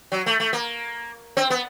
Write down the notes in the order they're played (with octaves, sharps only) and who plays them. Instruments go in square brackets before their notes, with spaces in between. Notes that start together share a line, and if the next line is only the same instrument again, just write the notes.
[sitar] F#3
A3
A3
A#3
C4
B3